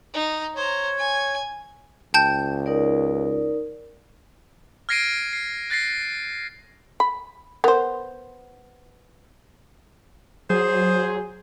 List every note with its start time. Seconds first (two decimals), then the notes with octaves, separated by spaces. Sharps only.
0.14 D#4
0.56 C5 C#5 A#5
0.97 G#5
2.14 C#2 G5 A5 G6
2.66 D#4 A#4 D5
4.89 F6 G#6 A#6 C7 D7 D#7
5.33 C7
5.70 F#6 A6 A#6 C7
7.00 B5
7.64 B3 A#4 C5
10.50 F#3 G#4 C5